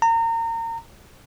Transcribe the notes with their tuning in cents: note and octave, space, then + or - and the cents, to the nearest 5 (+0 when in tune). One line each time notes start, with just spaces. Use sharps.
A#5 -30